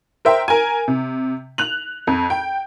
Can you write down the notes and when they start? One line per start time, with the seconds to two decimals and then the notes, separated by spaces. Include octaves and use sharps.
0.25 A#4 C5 E5 G5
0.48 A#4 G#5
0.88 C3
1.58 F#6 F7 F#7
2.07 F2
2.30 G5